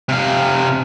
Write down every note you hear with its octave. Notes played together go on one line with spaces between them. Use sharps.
C3 F5